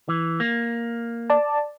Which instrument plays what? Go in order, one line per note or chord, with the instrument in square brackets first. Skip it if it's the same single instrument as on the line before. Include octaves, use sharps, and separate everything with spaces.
[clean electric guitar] E3
A#3
[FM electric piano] D5 A5